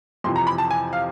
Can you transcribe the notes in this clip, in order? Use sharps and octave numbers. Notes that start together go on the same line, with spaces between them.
F2 C3 E3 C6
A#5
B5
A5
G#5
F5